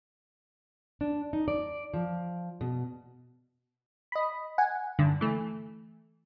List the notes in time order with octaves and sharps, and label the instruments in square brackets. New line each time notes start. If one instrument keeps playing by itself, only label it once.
[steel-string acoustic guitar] D4
D#4
D5
F3
B2
[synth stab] D#5 B5
F#5 G#5
G2 D3
E3 A3